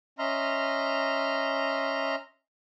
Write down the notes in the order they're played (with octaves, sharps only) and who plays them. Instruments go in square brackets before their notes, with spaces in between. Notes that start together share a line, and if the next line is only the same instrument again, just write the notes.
[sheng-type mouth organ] C#4 D#5 E5 A#5 C6 F6